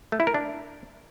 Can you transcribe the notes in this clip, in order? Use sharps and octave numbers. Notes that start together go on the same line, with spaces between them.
A3
E4
A#4
D4